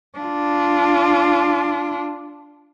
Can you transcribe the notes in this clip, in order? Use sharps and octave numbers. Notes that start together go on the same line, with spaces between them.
D4 F4